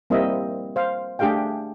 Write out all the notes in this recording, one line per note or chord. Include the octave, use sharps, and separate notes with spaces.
G3 A#3 C4 E4 D#5 E5
C5 F5
A3 D4 G4 G#4 F5 G5